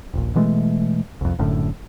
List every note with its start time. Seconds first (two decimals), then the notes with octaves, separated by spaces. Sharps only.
0.14 D#1 A#1
0.35 B2 E3 G#3 A3
1.21 C2 F2
1.39 F#1 F#2 A2 D3